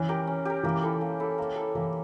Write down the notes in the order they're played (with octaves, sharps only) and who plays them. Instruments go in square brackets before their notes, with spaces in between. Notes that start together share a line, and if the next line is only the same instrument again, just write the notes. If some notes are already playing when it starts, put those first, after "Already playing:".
Already playing: [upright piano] E3 [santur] C#4
[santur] G4 A#4
C#4
G4 A#4
[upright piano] E3 [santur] A#3
[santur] E4 A4
A#3
E4 A4
A#3
A4
E4
[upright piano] E3 [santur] A#3